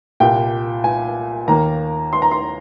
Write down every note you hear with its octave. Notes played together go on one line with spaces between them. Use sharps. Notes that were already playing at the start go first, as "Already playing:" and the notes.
C2 A#2 G3 G5
G#5
D#2 D#3 A#3 A#5
C6
A#5
C6